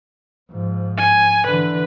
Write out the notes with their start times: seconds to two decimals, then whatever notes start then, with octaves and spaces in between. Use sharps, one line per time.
0.51 G#2 F3
0.97 G#5
1.46 D3 E3 B4